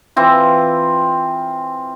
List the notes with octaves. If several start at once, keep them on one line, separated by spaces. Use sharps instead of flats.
E3 C4 F4